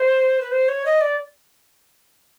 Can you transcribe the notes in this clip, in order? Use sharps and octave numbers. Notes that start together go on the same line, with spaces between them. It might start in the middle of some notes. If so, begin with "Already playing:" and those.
Already playing: C5
B4
C5
C#5
D#5
D5